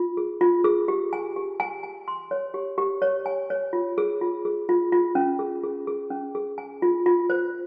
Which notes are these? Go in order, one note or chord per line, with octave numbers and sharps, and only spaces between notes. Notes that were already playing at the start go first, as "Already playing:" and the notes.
Already playing: F4
G#4
F4
G#4
G4
G#5
G4
G#5
G#5
C6
C#5
G4
G4
C#5
G#5
C#5
F4
G#4
F4
G#4
F4
F4
C#4
G#4
G#4
G#4
C#4
G#4
G#5
F4
F4
C5